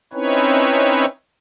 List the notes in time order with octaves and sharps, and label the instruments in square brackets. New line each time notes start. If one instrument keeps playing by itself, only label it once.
[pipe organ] C4 C#4 D#4 E4 B4 C#5